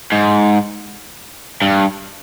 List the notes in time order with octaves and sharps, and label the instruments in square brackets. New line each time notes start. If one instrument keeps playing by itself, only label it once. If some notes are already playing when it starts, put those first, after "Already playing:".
[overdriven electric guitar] G#2
G2